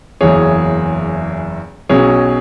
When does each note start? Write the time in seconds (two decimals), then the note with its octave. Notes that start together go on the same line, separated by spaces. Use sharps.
0.21 F#1 E2 E3 G#4 C#5
1.89 B1 B2 F#3 C#4 G#4 C#5